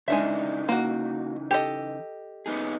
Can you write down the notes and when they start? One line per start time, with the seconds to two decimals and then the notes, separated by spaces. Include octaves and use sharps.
0.08 C#3 E3 G#3 D4 D#4 E5
0.69 A#3 F#4
1.51 G4 A4 D#5
2.46 B3 D#4 G#4